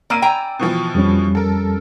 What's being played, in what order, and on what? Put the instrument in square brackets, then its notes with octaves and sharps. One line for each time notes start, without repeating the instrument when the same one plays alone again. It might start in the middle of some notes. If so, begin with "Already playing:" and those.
[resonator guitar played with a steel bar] A#3 [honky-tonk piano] D5 E6 D#7
[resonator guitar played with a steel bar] G5 G#5 A#5
[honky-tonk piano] B2 E3 F3
[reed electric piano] F2 G3 C#4
[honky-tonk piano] A4 A#4